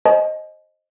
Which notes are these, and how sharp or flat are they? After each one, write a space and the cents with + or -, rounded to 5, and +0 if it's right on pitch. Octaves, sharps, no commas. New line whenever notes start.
C5 +20 D#5 +0 G#5 +45